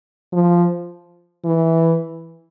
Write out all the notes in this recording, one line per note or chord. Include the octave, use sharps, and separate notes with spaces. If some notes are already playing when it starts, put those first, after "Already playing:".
F3
E3